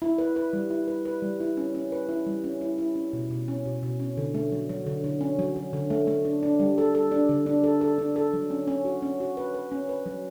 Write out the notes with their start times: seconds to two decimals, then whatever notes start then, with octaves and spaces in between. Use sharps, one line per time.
0.02 E4
0.18 B4
0.36 B4
0.53 G3
0.71 E4
0.88 B4
1.05 B4
1.22 G3
1.41 E4
1.57 C#4
1.75 C#4
1.92 B4
2.09 E4
2.27 G3
2.44 C#4
2.61 E4
2.78 E4
2.96 C#4
3.13 B2
3.31 B2
3.48 C#4
3.66 B2
3.83 B2
4.00 C#4
4.17 D3
4.35 A3
4.52 F#3
4.69 F#3
4.87 D3
5.04 D3
5.21 C#4
5.39 F#3
5.56 F#3
5.73 D3
5.90 A3
6.07 A3
6.25 D4
6.43 D4
6.60 G3
6.78 A4
6.95 A4
7.12 D4
7.29 D3
7.46 D4
7.64 A4
7.81 A4
7.99 D4
8.16 A4
8.34 F#3
8.50 C#4
8.68 C#4
8.85 F#4
9.02 C#4
9.20 F#4
9.37 B4
9.54 B4
9.72 C#4
9.89 B4
10.06 F#3